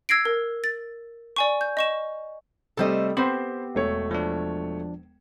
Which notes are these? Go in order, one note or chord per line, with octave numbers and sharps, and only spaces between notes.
E6 G#6 A#6 C7 D7
A#4
A6
D5 G#5 C#6
G6
D#5 C#6 E7
C3 G3 A3 A4 C5 D#5
B3 C4 G4 C5 B5
E1 A3 C#5
F3 D4